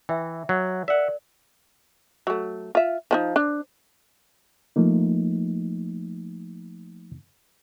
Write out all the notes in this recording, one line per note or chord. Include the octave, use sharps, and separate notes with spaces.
E3 E5 G5
F#3
A#4 D5 E5 F#5
F#3 A3
F4 E5
F3 C#4 D#4
D4
F3 A3 A#3 D#4